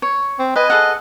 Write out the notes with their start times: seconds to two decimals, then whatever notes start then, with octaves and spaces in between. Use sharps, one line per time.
0.02 C#5
0.39 C4
0.56 B4 D#5 G#5
0.70 G#4 A4 F#5